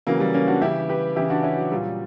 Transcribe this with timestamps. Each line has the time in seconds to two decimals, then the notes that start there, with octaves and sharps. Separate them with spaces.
0.07 C#3 E3 F#3 A#3
0.20 G3
0.34 A#3 C#4
0.48 D4 F#4
0.61 C#3 E3 E4 G4
0.89 G4 B4
1.16 C#3 E3 E4 G4
1.30 D4 F#4
1.43 C#4 E4
1.57 F#3
1.71 A#2 F#3 G3